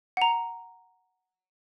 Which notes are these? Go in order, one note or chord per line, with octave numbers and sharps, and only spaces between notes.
F#5 A#5